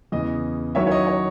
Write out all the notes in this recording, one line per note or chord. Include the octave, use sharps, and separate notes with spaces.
E2 C#3 E3 D#5
D#3 F#3 C#4 E4 C#5 E5
C#5
D#5
C#5